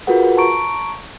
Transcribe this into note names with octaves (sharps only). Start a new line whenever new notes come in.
F4 F#4 G#4 A#4 B4 F#5
A5 A#5 C#6 D7